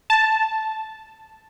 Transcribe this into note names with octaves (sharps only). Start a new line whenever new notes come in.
A5